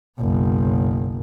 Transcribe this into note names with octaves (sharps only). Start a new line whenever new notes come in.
F#1 B1